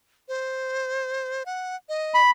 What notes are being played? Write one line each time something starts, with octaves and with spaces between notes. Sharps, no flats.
C5
F#5
D#5
B5